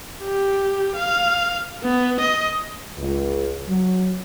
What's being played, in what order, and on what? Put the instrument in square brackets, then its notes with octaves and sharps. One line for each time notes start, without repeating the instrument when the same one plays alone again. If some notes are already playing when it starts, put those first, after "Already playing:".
[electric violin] G4
F5
B3
D#5
[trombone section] C#2
F#3